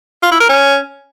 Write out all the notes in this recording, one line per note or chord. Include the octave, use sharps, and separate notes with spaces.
F4
E4
A#4
C#4